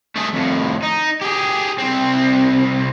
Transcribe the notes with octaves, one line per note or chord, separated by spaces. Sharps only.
A3 G#4
F2 A2
D#4
G4 G#4
C2 C4